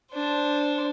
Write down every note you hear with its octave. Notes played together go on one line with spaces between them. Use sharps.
D4 C5